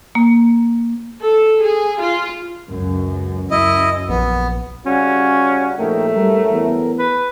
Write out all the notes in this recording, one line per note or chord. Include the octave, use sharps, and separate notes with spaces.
A#3
A4
G#4
F4
C#2 F#2
F#2 E4 D#5
A#1 B3
C#3 G3 C#4 F#4
A#1 A3 D#4 A#4 G5
F#2 A2 G3 A#4
E2
B4